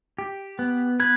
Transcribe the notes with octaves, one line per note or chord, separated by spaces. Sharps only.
G4
B3
B4 G#6